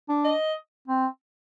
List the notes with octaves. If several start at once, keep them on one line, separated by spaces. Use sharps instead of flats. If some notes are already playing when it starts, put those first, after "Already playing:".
D4
D#5
C4